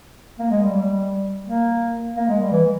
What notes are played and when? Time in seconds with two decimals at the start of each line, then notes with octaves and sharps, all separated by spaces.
0.39 A#3
0.51 G#3
0.63 G3
0.75 G3
1.45 A#3
2.16 A#3
2.28 G#3
2.40 G3
2.52 E3